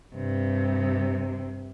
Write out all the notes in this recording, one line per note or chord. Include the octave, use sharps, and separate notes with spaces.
G2 C3